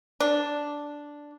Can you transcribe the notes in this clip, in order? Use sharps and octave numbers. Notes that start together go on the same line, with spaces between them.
D4